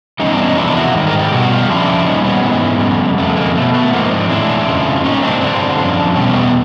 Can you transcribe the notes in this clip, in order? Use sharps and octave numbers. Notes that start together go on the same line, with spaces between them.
E2 B2 G3 C#4 D#4
C4 D4
C#4 D#4
E2 C3 F3 D4 E4
E4 F#4
G#2 D#3 G3
G#4 A#4
G4 A4
B2 G3 F#4 G#4
F4 G4
F2 C#3 F3 D4 E4
A#2 G3 C#4 D#4
B3 C#4
G#2 E3 G#3
F2 C#3 G3
F2 C#3 A3 B3
G#3 A#3
B2 F#3 A3
A3 B3
G#2 F3 A#3 C4
C4 D4
A2 E3 G#3 D4 E4
F2 C#3 F3 G#3
A#2 G3 C#4 D#4
C4 D4
G2 D3 G3 C4 D4
F#2 D3 F3
E2 B2 G3 C#4
A3 B3